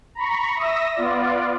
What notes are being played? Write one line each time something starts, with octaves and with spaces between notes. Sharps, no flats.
A#5 B5 C#6
E5 D#6 E6 A#6
B3 F4 D5